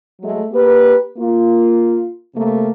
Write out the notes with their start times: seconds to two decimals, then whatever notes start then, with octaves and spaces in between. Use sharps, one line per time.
0.21 F#3 G#3 A3
0.53 A#3 G4 B4
1.17 A#3 F4
2.35 C3 A3 A#3